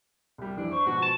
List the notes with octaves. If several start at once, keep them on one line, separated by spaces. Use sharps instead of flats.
C2 G3
F2 E3 D4
C5 C#6
G#2 B2 F3 F#4
A5